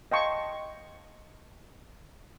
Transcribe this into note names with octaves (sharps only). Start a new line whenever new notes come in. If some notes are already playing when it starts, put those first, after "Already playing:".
D#5 F5 G5 A5 C6 C#6